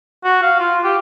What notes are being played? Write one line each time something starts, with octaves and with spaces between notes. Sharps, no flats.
F#4
F5
F4
G4